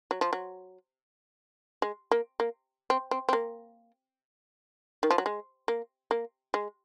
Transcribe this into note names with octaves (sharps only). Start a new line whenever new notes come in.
F#3
F3
F#3
G#3
A#3
A#3
C4
C4
C4
A#3
D#3
F3
F#3
G#3
A#3
A#3
G#3